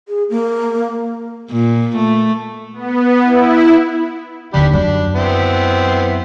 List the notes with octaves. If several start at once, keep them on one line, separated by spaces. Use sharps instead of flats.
G#4
A#3
A#2
A3
B3
E4
D#2 D3 D4 G4 B5
F#2 D4
B3 C4 E4